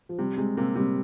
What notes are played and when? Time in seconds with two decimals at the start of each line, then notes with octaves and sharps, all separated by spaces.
0.09 F3
0.18 C3 G3
0.37 C3 G#3
0.57 C3 A#3
0.76 C3 G3